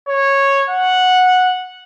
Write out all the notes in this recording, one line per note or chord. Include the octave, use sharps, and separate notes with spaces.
C#5
F#5